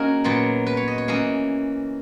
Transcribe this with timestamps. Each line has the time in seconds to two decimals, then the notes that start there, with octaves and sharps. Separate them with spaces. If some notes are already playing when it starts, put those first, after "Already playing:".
Already playing: A#3 C#4 D#4 F#4 G#4 A#4
0.24 A#2 F#3 B3
0.66 B4
0.77 C#5
0.88 D#5
0.98 C#5
1.08 E3 A#3 C#4 D#5